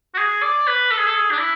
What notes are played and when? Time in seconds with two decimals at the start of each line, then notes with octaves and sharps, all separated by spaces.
0.14 F#4
0.18 G#4
0.42 D5
0.67 B4
0.91 A4
0.98 G#4
1.07 A4
1.15 G#4
1.31 D4
1.39 E4